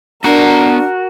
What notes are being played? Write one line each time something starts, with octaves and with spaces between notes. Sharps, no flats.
B3 D4 F#4 A#4 A#5